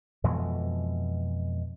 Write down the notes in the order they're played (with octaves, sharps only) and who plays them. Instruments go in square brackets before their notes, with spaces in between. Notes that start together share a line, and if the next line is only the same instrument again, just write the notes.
[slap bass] F2 B2 E3 G#3